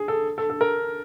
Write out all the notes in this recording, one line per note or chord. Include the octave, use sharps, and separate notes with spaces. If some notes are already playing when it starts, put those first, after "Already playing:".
Already playing: G#4
A4
A4
A4
A#4